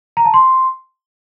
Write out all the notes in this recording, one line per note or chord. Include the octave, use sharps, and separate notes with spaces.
A#5
A5
C6